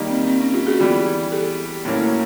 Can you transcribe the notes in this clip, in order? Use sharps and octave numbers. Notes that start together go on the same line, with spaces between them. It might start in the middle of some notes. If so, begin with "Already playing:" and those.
Already playing: D#3 G3 A#3 D#4
C4
C4
C#4
F4 G4
F#4 G#4
E3 G3 B3 E4
G4 A4
A2 F#3 A#3 C#4